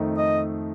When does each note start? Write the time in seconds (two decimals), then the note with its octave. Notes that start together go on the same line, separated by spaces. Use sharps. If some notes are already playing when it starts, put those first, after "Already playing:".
Already playing: F2 D#3 A3 D#4
0.17 D#5